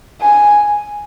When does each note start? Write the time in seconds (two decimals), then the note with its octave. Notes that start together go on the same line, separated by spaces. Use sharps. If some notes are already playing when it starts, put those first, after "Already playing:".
0.21 G#5